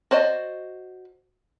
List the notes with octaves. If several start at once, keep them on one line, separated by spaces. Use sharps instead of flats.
F#4 C5 D5 D#5